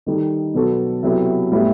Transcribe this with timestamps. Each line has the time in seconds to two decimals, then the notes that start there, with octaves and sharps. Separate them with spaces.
0.06 D#3 G3 D#4 A4
0.54 B2 F#3 B3 F#4 A4
1.03 C3 F#3 B3 E4 A4
1.52 A2 G3 B3 E4